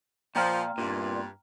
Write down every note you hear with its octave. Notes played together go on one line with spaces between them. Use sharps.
A#2 F3 F5 G5 A#5 F6
C2 G2 A#2